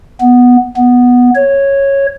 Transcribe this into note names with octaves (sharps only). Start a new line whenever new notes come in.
B3
B3
C#5